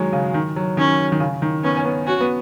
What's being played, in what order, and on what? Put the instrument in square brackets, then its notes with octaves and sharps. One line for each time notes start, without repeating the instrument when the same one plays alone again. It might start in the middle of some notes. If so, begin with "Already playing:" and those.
Already playing: [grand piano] D#3 F#3 G#3
C#3
D#3
F#3
[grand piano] D#3 [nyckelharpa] C#4
[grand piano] D#3
C#3
D#3
[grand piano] B3 [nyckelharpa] C#4
[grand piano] C#4
B3
[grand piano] C#4 [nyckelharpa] F#4
[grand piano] B3